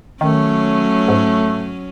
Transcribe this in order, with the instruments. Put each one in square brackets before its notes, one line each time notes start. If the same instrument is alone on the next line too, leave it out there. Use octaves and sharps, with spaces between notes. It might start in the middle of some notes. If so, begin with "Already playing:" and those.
[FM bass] D#3 [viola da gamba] F#3 C#4 [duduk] A3
[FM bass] G#2